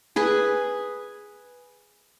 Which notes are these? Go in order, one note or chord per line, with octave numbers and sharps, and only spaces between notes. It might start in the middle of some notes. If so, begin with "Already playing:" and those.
G#4 B4 G#5